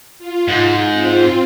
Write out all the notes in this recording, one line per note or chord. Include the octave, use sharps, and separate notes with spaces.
F4
G#2
C4 F4